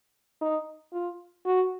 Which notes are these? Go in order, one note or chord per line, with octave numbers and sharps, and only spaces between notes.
D#4
F4
F#4